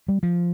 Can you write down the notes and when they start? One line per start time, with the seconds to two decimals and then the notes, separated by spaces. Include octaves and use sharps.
0.08 G3
0.23 F3